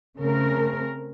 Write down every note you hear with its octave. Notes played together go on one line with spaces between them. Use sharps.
C#3 A3 C4 A#4